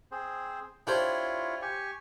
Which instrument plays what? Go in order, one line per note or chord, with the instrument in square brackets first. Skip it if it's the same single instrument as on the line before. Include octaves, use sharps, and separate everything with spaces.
[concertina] C4 G#4 C5
[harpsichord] D4 G4 C5 [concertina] E4 F4 C#5
[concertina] G4 G#5 C#6